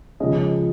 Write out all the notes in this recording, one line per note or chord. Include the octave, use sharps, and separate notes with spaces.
C#2 C#3 F3 G#3 C#4 D#5